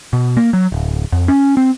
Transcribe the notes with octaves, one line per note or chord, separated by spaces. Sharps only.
B2
A#3
F#3
D1
F2
C#4
C4